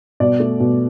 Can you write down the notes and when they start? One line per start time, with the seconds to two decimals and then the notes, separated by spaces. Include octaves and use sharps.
0.20 B2 D5
0.40 A3
0.60 B2